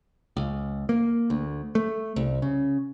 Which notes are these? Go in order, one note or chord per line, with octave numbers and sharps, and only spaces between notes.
C#2
A#3
D2
A3
C2
C#3